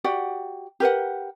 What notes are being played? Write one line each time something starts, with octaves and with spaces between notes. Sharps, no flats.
F#4 G4 D5 F#5
G4 A#4 B4 F#5